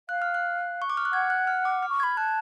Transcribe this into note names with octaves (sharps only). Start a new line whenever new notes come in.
F5 F#6
F6
F#6
C#6
D6
F6
F#6
F#5 G#6
F#6
F6
D6
F6
C#6
B5 G#6
A5 F#6